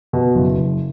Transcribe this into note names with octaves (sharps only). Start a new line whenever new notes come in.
B2
F#1
F#1